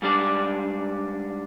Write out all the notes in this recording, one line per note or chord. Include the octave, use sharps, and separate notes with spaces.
G#2 G3 D4 D5